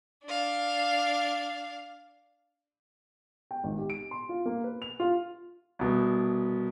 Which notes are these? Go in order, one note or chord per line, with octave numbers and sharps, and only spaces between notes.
D4 F5
G5
G#1
G4
D7
C6
F4
A#3
B4
F7
F4
C2 B2